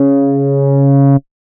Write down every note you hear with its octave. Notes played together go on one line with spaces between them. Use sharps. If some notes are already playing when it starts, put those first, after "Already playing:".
Already playing: C#3